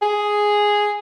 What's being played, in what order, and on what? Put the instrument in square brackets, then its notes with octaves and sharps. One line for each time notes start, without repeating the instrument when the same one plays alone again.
[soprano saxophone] G#4